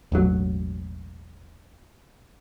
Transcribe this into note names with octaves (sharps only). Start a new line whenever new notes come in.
E1 A1 F#3